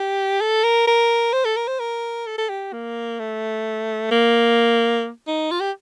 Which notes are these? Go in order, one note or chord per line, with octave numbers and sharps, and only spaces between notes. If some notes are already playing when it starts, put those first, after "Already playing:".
Already playing: G4
A4
A#4
A#4
C5
A4
A#4
C5
A#4
A4
A4
G4
A#3
A3
A#3
D#4
F4
G4